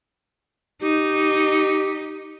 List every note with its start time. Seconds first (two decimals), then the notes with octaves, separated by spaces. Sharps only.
0.82 D#4 G4